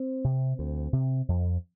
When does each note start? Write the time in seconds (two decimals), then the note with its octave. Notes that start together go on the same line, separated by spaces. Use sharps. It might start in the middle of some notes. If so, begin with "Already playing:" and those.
Already playing: C4
0.24 C3
0.59 D2
0.93 C3
1.28 F2